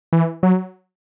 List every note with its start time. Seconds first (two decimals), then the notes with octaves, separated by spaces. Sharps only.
0.13 E3
0.43 F#3